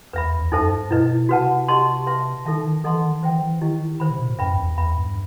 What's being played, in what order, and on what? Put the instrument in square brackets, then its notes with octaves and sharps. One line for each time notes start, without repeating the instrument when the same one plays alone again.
[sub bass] E2 [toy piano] B4 E5 B5
[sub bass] E2
[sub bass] F#2 [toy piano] D#4 A4 C5 E5 A5
[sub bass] G2
[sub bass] B2 [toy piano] E4 B4 D#5
[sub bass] C3 [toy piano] F#4 B4 F#5 A5
[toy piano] G4 D#5 A5 C6
B4 E5 A5 C6
[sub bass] D#3 [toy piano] D#4 A4 E5 A5
[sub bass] D#3
[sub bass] E3 [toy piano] A4 D#5 F#5 A5 C6
[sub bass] D#3
[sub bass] E3 [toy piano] C5 E5 G5
[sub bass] E3
[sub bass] D#3 [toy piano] E4 G4 D#5
[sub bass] D#3 [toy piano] C5 E5 B5
[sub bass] C3
B2
A2
[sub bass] F#2 [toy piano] B4 E5 G5 B5
[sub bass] F#2
E2
[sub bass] E2 [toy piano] B4 E5 B5
[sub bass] G2